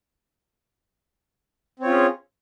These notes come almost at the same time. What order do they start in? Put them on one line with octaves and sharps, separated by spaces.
C4 C#5 F4 C#4 G#4